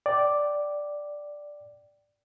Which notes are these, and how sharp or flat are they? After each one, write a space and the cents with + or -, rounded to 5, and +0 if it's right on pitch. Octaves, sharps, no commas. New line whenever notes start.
D5 +0 G5 -25